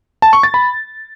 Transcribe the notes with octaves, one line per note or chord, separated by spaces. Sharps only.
A5
C#6
A6
B5